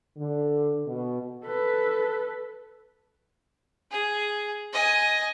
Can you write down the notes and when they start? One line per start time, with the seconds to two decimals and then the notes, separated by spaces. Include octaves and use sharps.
0.18 D3
0.87 B2
1.44 A4 B4
3.91 G#4
4.73 D#5 G#5